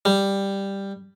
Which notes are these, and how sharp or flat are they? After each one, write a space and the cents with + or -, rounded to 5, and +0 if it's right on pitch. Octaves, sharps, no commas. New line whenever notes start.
G3 +5